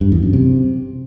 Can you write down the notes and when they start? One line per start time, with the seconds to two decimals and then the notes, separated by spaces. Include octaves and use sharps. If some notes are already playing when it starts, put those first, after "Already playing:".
0.01 G2
0.12 E2
0.23 F#2
0.33 C3